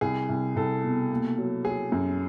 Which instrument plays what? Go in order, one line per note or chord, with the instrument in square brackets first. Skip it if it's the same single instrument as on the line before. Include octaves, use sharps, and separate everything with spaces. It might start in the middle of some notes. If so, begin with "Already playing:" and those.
[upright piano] C2 [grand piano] G#4
[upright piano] C2
[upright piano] C2 [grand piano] A4
[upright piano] B2
A#3
F#3
[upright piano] F#3 [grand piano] G#4
[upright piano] F#2